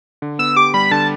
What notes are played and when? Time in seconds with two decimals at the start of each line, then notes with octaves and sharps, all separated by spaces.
0.22 D3
0.39 B3 E6
0.56 G4 D6
0.74 G3 B5
0.91 D3 A5